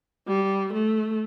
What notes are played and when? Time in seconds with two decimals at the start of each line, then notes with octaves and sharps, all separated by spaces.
0.27 G3
0.73 A3